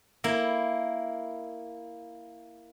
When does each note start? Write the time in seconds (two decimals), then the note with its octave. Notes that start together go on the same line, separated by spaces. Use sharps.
0.24 A#3 E4